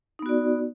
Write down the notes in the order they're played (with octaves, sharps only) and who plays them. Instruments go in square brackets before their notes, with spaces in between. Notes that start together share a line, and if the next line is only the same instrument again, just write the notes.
[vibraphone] D#4
B3
F#4
D5